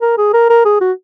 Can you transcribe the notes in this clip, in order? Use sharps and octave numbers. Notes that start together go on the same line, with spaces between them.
A#4
G#4
A#4
A#4
G#4
F#4